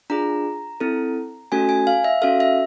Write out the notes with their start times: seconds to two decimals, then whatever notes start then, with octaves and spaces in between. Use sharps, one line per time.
0.10 D4 F4 G#4 A#5
0.80 C4 E4 A4
1.52 A3 C#4 F#4 A4 G#5
1.69 G#5
1.87 F5
2.04 E5
2.22 C#4 F#4 A4 F5
2.40 E5